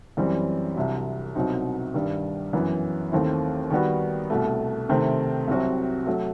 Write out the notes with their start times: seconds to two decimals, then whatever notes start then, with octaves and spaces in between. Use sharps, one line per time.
0.17 F#2 E3 G3 C4
0.76 C2 C3 F#3
1.35 C2 B2 F#3 C4 D#4
1.94 G2 D#3 G3
2.53 F#2 E3 B3
3.12 D#2 D#3 A3 C4 E4
3.70 D#3 G3 B3 F#4
4.30 C2 B2 A3
4.89 C3 D#3 A3 C4
5.47 C2 C3 F#3 C4 F#4
6.06 F#3 A3